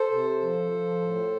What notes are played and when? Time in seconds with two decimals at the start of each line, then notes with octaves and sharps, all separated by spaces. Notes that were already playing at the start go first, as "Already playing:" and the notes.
Already playing: A4 C5
0.11 C3
0.41 F3
0.71 F3
1.01 A2